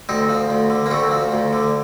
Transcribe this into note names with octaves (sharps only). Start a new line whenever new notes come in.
D2 C4 D#4
F3
D2
D3
A#3
D2 A3 C4
F3
D2
D3